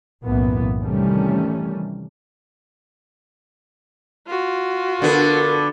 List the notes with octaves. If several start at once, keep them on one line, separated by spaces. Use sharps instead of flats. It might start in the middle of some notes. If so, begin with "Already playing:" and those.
B1 F#2 A2 E3 A#3 B3
C3 D#3 E3 G3 A3 C#4
F4 F#4
D3 B3 A4 A#4